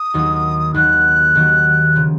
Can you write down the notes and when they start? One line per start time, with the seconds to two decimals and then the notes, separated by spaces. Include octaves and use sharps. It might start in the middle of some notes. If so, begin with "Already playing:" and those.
Already playing: D#6
0.14 D#2 D#3 F#3
0.74 D#2 D#3 F#3 F#6
1.35 D#2 D#3 F#3
1.96 C#3 F3